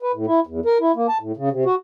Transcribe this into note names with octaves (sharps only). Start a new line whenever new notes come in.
B4
A2
E4
E2
A#4
E4
A#3
A5
A2
C#3
C3
F#4